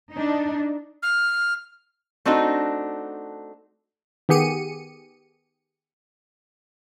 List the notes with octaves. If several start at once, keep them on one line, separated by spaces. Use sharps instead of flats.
D4 D#4
F6
A3 C4 D4 D#4 F#4
D#3 B3 G4 G#4 C#7 D#7